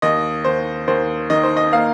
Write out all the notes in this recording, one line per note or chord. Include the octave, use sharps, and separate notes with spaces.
D#2 D#5
D#2 C5
D#2 C5
D#3 D#5
C5
D#5
A#3 F5